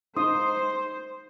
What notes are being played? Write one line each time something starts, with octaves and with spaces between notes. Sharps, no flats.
D#4 C5 C6 D#6